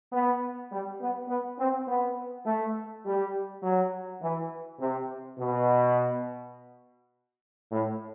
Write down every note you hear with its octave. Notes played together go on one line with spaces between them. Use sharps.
B3
G3
B3
B3
C4
B3
A3
G3
F#3
E3
C3
B2
A2